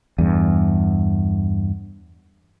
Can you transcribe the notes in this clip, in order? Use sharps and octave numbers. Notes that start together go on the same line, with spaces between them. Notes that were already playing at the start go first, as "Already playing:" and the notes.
E2 G2